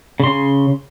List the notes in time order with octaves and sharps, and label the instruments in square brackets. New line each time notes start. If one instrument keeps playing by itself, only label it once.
[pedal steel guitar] C#3 C6